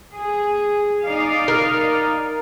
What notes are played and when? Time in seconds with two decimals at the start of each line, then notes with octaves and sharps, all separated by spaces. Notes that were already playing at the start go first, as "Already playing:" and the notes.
0.14 G#4
1.05 D#4 D5 F5
1.48 A#4